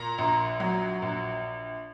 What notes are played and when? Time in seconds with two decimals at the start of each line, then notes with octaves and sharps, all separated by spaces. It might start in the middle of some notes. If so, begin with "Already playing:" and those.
Already playing: A#2 A#5
0.18 A#1
0.60 F#3
1.02 A#1